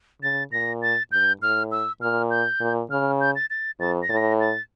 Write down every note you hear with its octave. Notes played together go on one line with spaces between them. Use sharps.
C#3 A6
A#2 A#6
A6
G2 G6
A2 F6
E6
A#2 F6
G6
A#2
C#3 F6
G6
A6
A6
F2 A6
A#6
A2 A6
A#6
A6